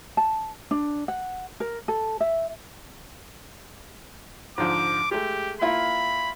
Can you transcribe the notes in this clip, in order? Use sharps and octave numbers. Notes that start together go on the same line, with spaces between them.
A5
D4
F#5
A#4
A4
E5
G#2 D3 F3 D6
G#3 A3 G4
A#3 E4 F4 B5